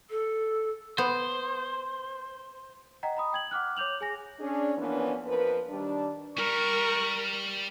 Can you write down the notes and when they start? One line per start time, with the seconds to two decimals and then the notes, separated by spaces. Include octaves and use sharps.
0.10 A4
0.98 B3 C5
3.03 D#5 F#5 G5 A#5
3.17 A#5 B5 D#6
3.33 G5 G#6 F#7
3.51 F#5 D6 F6 F#6
3.77 C#5 D6 G6 F7 F#7
4.01 G#4 G#5 A#6
4.40 C#4 D4 G#4
4.78 E3 F3 A#3 B3 C#4 D4
5.26 F2 F3 A#4 B4
5.70 D#3 G3 D4
6.38 G3 A#4 C#6